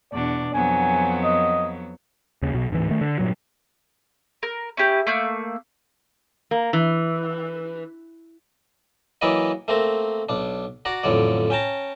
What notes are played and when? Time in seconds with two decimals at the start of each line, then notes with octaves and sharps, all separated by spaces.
0.12 E2 B2 D4 D5
0.54 F2 F#3 B3 G#5
1.23 D#5
2.42 D#2 C#3
2.54 B1 B2
2.70 D1 G#2 E3
2.90 D#3 A3
3.01 D3
3.19 G2 A#2 F#3
4.43 A#4
4.77 C#4 E4 G4
5.07 A3 A#3 G6
6.51 A#3
6.73 E3
9.21 E3 F#3 A#3 E4 D5 D#5
9.68 A3 A#3 C4 A#4
10.29 B1 D4
10.85 F#4 D5 A#5
11.03 A1 F2 D3 F#3 D5
11.50 C#4 G5 A5 A#5